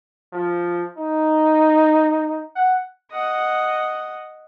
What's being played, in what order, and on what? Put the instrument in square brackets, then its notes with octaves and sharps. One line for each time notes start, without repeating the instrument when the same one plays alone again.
[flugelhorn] F3
D#4
F#5
[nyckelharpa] D#5 F#5